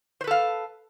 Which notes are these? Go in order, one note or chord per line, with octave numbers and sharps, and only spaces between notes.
A4 B4 C5 F5